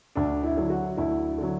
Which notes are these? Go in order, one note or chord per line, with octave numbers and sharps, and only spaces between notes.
D2 D4
E4
D3 F#3
F#4
D2 E4
D3 F#3